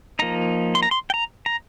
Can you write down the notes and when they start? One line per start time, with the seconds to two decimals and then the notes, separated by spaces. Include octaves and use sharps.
0.19 F3 A#3 D#4 A#5
0.75 C6
0.83 A#5
0.91 C6
1.10 G5
1.14 A#5
1.46 A#5